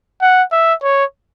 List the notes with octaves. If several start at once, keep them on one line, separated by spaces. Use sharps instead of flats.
F#5
E5
C#5